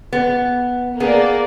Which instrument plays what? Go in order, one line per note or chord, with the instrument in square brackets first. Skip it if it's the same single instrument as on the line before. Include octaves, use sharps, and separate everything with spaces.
[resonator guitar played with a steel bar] B3
[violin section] A#3 D5 [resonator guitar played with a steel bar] B3 G#4